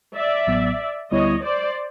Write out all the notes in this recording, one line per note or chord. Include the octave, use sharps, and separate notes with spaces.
D5 E5
A1 A2 F#3 B3
D2 D3 G3 B3 E4 C#5 D#5
C5 D5